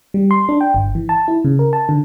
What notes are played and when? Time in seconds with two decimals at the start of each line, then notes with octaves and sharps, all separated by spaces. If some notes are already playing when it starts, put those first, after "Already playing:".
0.14 G3
0.31 C6
0.49 D4
0.61 G5
0.75 G1
0.95 E3
1.09 A5
1.28 E4
1.45 C#3
1.59 A#4
1.73 A5
1.89 D3